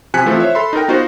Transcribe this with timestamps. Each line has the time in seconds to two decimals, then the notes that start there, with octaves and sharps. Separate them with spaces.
0.14 C3 F3 G#5 F#6 B6 C#7
0.26 E3 F3 A3 C4 F4
0.40 C5 C#5 E5
0.55 A4 B5 C6
0.73 D#4 A4 A#4 G5
0.88 B3 D#4 F4 F#4 C5